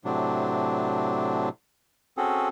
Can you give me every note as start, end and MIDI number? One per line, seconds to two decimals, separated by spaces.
0.05 1.49 45
0.05 1.49 48
0.05 1.49 54
0.05 1.49 62
2.17 2.49 60
2.17 2.49 61
2.17 2.49 66
2.17 2.49 68
2.17 2.49 69